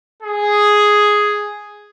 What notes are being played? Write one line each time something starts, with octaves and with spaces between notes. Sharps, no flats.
G#4